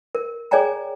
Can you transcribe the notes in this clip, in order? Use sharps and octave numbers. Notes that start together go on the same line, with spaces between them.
A#4
G#4 C#5 D5 G5 G#5 A#5